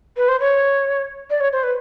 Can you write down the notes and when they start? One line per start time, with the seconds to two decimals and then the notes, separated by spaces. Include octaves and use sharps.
0.17 B4
0.28 C5
0.40 C#5
1.30 D5
1.40 C#5
1.52 C5
1.63 B4